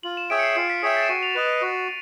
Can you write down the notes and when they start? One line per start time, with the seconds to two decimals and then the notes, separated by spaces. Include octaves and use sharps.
0.03 F4 F#7
0.17 E7
0.30 G#4 C#5 E5 G5 D7
0.39 C#7
0.43 C7
0.56 F4 C7
0.70 B6
0.82 G#4 C#5 E5 G5 B6
0.97 A6
1.03 E7
1.09 F#4 D#7
1.23 F7
1.35 B4 D#5 E7
1.49 D#7
1.62 F#4